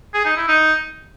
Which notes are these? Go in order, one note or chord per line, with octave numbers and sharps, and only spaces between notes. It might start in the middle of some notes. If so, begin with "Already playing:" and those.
G#4
D#4
E4
D#4